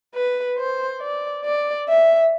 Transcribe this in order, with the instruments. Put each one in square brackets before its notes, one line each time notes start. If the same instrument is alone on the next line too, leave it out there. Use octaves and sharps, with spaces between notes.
[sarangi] B4
C5
D5
D5
E5